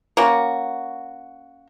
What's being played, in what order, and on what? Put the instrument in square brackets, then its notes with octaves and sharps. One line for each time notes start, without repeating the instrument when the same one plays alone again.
[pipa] A#3 C#4 F#4